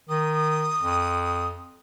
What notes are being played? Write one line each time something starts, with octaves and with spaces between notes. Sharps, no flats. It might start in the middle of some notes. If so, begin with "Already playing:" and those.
D#3 D#6
F2